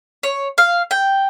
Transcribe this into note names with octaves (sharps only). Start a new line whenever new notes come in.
C#5
F5
G5